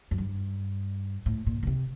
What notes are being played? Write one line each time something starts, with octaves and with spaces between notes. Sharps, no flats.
F#2
G2
A2
A#2
D3
C3